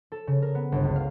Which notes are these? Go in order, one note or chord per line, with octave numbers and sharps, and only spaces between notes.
A4
C#3
A#4
B3
G1
C#2
F5